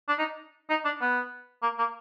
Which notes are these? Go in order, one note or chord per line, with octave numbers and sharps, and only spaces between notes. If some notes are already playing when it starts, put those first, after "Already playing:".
D4
D#4
D#4
D4
B3
A#3
A#3